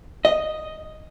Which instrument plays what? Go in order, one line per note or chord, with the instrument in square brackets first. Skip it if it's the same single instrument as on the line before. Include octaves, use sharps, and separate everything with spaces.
[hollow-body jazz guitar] D#5